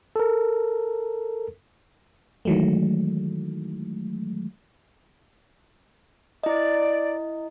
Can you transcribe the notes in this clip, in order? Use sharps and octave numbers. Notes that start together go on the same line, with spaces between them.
A4 A#4
D#3 E3 F#3 G#3 A3
E4 D5 D#5